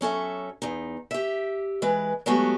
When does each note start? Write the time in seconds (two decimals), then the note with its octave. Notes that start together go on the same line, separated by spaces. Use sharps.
0.01 F#3 C#4 A4 E5
0.62 E2 D#4
1.11 G4 E5
1.82 E3 G#3 B4
2.26 F#3 G#3 A3 B3 F#4 G4